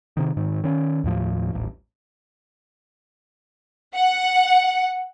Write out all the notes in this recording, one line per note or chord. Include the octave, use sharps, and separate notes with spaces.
C3 D#3
G#2 D#3
D#3 C#4
D#2 A2 F3
D#1 A1 E2
F#5